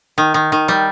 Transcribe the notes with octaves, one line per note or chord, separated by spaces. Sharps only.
D#3
D#3
D#3
G3